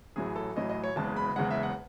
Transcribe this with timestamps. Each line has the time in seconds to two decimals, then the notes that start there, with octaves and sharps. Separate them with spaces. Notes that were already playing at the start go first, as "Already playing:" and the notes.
0.16 A1 A2 F#3 G#4
0.36 A4
0.56 A1 A2 F#3 D#5
0.70 D#5
0.84 C#5
0.96 F#1 E2 C#3 G#3 A5
1.16 B5
1.36 F#1 E2 C#3 G#3 F#5
1.50 E5
1.63 F#5